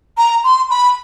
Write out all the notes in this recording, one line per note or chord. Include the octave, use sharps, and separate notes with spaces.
A#5
C6
B5